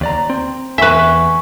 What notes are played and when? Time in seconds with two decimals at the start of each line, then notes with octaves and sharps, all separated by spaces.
0.01 D#2 D5 A#5
0.30 C4
0.78 E2 B4 E5 G#5 C#6